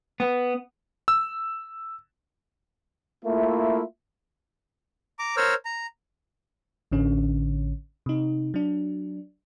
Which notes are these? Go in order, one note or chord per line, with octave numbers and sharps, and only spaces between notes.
B3
E6
A3 A#3 E4 F4 E5
A#5 D6
A#4 C5 C#5 E6 F6
A#5
A1 D3 C#4
C3 D#4
F#3 D4